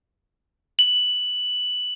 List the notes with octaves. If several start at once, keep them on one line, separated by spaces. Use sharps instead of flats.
F#7